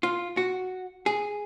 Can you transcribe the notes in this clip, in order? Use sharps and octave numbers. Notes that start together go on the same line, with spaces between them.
F4
F#4
G#4